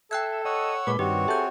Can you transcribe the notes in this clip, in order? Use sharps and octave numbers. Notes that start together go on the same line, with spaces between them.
A4 E5 G5 F#6 G#6
C#5 D#5 F#5 E6
A#2 G#3 B4 B5 D6
G2 D#3 C4 F#4 G4 C#5
G#4 A4 E5 G6